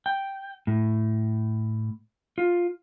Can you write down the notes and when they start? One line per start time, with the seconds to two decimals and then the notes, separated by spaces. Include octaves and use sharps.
0.06 G5
0.67 A2
2.38 F4